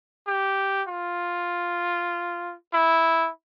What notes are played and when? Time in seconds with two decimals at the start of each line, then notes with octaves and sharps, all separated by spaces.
0.27 G4
0.88 F4
2.74 E4